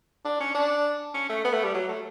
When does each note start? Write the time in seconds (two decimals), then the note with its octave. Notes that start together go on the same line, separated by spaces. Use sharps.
0.25 D4
0.40 C#4
0.54 D4
1.14 C#4
1.29 A3
1.45 B3
1.53 A3
1.64 G3
1.74 F#3
1.89 A3